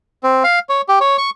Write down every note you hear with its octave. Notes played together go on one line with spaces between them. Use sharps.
C4
F5
C#5
G4
C#5
C#6